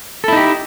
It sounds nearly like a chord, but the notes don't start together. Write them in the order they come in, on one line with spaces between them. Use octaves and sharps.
A4 E4 D#4 G4